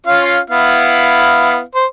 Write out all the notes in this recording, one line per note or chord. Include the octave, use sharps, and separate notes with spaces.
C#4 F4 F5
B3 E4 F5
C5